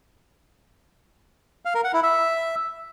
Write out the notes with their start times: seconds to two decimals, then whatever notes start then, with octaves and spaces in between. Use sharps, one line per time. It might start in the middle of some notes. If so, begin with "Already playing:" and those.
1.65 F5
1.75 A#4
1.84 F#5
1.94 E4
2.03 E5